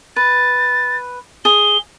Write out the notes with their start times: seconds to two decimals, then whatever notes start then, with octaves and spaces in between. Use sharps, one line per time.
0.16 B4 A6
1.45 G#4 G7